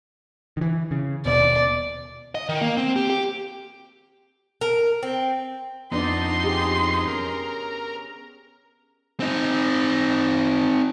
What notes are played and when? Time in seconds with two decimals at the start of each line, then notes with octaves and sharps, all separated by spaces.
0.57 D#3 E3
0.91 C#3
1.26 D#1 D#2 B2 D5
2.35 D#5
2.49 D#3
2.62 A#3
2.77 C4
2.96 G4
3.10 G4
4.61 A#4
5.03 C4
5.92 F2 B3 D4 D#4 D5 C6
6.44 G4 G#4
7.07 C#4 A#4
9.20 C4 D#4